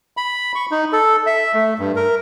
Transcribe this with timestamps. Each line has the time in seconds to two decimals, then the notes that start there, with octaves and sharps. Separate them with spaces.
0.17 B5
0.55 C#6
0.71 D#4
0.93 A4
1.26 E5
1.54 A3
1.79 G2
1.96 A#4